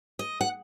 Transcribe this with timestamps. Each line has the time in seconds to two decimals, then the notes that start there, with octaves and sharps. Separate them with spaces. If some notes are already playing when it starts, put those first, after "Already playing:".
0.19 D#5
0.41 F#5